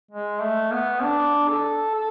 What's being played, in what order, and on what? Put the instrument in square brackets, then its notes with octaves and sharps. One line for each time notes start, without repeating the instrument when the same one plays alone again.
[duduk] G#3
A3
B3
D4
A4
A4